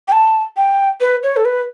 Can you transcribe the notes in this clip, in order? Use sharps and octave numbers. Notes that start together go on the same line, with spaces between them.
G5
A5
G5
B4
C#5
A4
B4